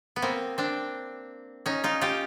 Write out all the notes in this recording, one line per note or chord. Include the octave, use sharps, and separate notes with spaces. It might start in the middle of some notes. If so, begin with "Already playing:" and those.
B3
A#3 C4
C4 D4
C#4 D#4
D#4 F4
F4 G4